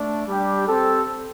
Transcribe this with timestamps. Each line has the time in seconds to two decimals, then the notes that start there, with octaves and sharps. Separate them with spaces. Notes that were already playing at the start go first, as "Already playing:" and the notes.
Already playing: A3 D4
0.28 G3 D4 G4
0.67 C4 G4 A4